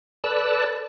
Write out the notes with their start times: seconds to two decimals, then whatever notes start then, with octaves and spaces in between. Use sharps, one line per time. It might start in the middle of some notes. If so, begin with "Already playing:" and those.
0.24 A4 B4 D5 A5 E6 F#6